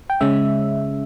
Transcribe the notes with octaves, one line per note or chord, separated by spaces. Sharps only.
G5
C#3 G#3 C#4 E5